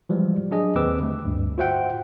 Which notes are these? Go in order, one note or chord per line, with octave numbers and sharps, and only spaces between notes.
E3 F3 G3 G#3
F#3 D4 G#4 D#5
D#2 C4 B4 D6 E6
D3 A3
D2 G2
F4 F#4 C5 E5 F#5 G5